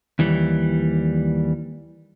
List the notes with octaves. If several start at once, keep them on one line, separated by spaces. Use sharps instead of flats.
D#2 E3 G3